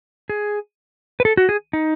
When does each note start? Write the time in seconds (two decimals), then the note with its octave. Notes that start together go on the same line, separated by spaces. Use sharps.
0.30 G#4
1.20 B4
1.25 A4
1.37 F#4
1.49 G#4
1.73 D#4